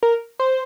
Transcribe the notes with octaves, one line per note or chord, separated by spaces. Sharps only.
A#4
C5